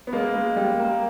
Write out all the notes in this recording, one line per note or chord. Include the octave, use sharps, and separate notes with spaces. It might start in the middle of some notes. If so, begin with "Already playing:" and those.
B3
G#3 A#3
G#3
G3
A#3